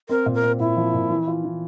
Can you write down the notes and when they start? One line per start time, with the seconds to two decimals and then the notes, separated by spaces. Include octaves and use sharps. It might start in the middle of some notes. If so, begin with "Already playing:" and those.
0.09 C4 A#4
0.26 A#2
0.34 A#4
0.43 C4
0.60 A#2 E4
0.77 F3
0.94 A#2
1.10 E3
1.28 F4
1.44 E3